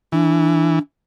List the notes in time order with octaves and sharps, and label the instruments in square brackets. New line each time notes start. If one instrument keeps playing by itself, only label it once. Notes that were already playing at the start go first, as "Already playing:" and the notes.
[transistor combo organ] E3 [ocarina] D4